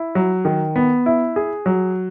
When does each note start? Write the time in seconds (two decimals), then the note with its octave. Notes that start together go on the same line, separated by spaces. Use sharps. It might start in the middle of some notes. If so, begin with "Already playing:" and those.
Already playing: E4
0.15 F#3
0.45 D#3
0.76 B3
1.06 E4
1.36 G#4
1.66 F#3